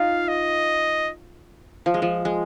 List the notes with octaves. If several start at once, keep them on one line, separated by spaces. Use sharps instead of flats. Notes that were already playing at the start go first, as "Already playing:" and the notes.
Already playing: D#4 F4 F5
D#5
F3
G#3
F3
G#3